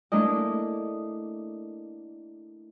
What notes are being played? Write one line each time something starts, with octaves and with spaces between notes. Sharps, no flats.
A3 A#3 D4 E4 D#5